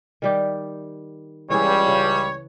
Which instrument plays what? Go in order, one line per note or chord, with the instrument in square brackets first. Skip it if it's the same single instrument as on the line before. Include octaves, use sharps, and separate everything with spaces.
[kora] D#3 G3 G4
[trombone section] C#2 G3 [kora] E3 G#4 [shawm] C#5
[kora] C#3